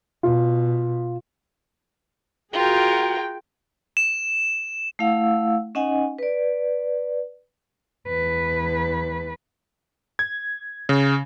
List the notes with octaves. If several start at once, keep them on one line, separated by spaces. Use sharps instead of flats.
B2 F4
F4 F#4 G#4 A#4 G5
E7
A3 E4 F5 F#5 E6
C#4 D#4 D#5 F#5 G#5
B4 D5
E2 B4
G#6
C#3